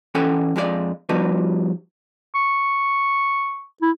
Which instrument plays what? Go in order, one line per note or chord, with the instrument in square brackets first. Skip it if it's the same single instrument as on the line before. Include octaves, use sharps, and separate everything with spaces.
[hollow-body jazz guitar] E3 C#4 A4 F#5 G5
F2 G#3 D4 D5 F5
F3 G3 B3 D#4 F#4 B4
[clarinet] C#6
E4